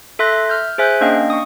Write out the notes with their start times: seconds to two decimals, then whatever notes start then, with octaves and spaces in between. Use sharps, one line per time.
0.19 A4 E5 C6 F#6 A#6
0.32 E5
0.49 F6 G6
0.78 G#4 C5 E5 G#5 F#6 G6
1.01 A#3 C#4 D4 D#5 F5 G5
1.30 C#6 D#6